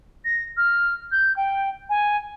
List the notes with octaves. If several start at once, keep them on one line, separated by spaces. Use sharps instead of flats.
A#6
F6
G6
G5
G#5